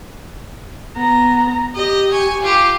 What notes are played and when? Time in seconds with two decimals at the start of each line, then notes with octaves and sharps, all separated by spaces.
0.96 B3 A#5
1.75 G4 D#5
2.11 G#5 C#6
2.42 F4 G4